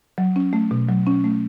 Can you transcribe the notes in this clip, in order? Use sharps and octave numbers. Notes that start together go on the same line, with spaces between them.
F#3
C#4
A3
B2
F#3
C#4
A3